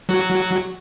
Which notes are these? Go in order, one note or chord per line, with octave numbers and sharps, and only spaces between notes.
F#3 F#4